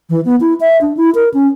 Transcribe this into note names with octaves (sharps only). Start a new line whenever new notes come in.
E3
B3
E4
E5
D4
E4
A#4
C#4